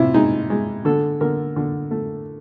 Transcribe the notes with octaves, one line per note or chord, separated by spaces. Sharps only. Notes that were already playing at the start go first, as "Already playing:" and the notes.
Already playing: C3 E4 F4
G#3 D#4
G#3
D3 A4
D3 A#4
D3
A3